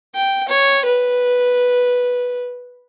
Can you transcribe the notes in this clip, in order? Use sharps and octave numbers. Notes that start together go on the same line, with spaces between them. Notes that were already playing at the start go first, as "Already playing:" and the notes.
G5
C#5
B4